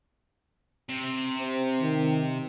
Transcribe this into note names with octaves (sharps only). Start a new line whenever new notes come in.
C3
C4
D#3